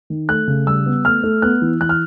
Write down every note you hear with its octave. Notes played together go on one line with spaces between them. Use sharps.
D#3
A3 F#6
C#3
G3 E6
B3
A3 F6
A3
B3 F#6
E3
E3 F#6
F6